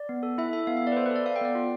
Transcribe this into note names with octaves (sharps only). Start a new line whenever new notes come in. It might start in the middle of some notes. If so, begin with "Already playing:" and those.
Already playing: D5
B3
A4
E4 E5
A4 E5
B3 F5
E5
B3 D5
B4
A4 C5
B4
A4 D5
A4 F5
G5
B3 D5
F4